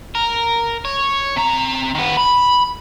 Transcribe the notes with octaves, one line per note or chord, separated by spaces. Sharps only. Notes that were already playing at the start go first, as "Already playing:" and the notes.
A#4
C#5
C3 A#5
D#3 B3
B5